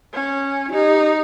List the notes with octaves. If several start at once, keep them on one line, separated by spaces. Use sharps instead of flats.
C#4
E4
D#4 G4